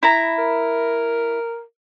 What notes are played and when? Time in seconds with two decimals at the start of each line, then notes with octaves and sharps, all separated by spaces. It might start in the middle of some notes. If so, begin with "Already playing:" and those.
0.03 E4 A#5
0.38 A#4